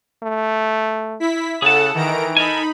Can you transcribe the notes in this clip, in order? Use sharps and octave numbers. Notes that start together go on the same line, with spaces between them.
A3
E4 B6
C#3 G#4 A4 F#5 A5
D#3 E3 A#5 D7
D#4 A4 A#4 G#5 B5